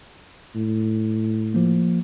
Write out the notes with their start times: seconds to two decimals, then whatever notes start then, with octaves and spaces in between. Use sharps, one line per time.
0.55 A2
1.54 F3 A#3